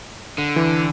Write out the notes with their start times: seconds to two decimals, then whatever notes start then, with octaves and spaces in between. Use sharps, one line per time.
0.38 D3
0.56 E3